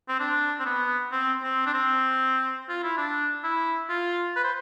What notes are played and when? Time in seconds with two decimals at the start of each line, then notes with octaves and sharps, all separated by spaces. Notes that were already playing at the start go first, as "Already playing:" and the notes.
0.08 C4
0.20 D4
0.60 C4
0.66 B3
1.12 C4
1.43 C4
1.66 D4
1.74 C4
2.69 F4
2.83 E4
2.98 D4
3.44 E4
3.89 F4
4.36 B4
4.44 C5